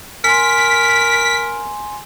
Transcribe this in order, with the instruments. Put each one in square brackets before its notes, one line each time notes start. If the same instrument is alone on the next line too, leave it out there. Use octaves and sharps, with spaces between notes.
[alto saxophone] A#4 [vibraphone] G#5 C6 [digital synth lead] B6